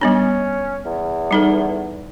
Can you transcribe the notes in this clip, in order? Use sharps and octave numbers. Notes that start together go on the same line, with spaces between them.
G3 B3 C#4 D4
E2
G3 D#4 A4